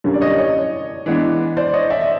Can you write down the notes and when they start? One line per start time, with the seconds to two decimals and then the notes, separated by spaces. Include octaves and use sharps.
0.04 F#2 D3 G3 A#3 C#4
0.14 D5
0.21 C#5 D#5
0.38 C#5 D#5
1.06 E3 G#3 B3 D4
1.57 C5 D5
1.73 C#5 D#5
1.90 D5 E5
2.01 E5